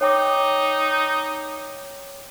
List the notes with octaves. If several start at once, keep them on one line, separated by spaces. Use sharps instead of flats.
D#4 C#5 G5 D6